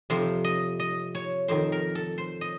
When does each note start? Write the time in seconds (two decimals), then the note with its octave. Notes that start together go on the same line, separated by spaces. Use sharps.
0.10 F2 C3 F3 C5
0.44 D#5
0.79 D#5
1.15 C#5
1.48 F2 D#3 C5
1.72 A#4
1.95 A4
2.18 C5
2.41 D#5